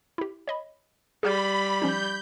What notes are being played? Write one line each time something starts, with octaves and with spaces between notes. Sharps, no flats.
E4 G4
C#5 D#5 B5
G3 G#4 B5 F6 G6
F3 C#4 D#4 G6